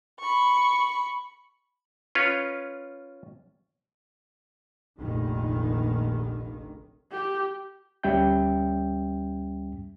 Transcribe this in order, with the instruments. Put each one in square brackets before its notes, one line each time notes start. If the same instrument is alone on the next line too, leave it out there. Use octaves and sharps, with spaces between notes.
[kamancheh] B5 C#6
[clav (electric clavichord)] C#4 F4 B4 C#5
[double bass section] F1 A#1 D#3
[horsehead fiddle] G4
[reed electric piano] D2 G3 C#4 E5 G5 G6